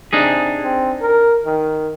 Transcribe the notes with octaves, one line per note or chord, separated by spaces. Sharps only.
C3 D4 D#4 G#4
C4
A#4
D#3